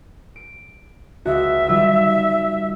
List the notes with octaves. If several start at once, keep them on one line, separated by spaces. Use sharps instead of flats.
D7
C#2 F#4 E5
D#3 G3 F4